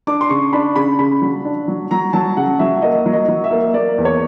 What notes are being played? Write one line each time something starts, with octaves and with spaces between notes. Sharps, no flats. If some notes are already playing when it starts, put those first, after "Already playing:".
D4 D6
C6
C#3 C#6
D4 B5
C#3 B5
C#3 B5
F#3
D4
F#3
F#3 A#5
F#3 A5
C#3 F#5
F#3 E5
A#3 D#5
F#3
D#5
F#3
E5
A#3
A#3 D5
E2
C#5